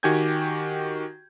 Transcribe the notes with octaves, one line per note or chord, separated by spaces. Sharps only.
D#3 F#4 G4 G#5 G6 G#6